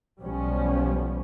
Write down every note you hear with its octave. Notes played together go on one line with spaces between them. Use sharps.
B1 B2 F3 G3 B3 C#4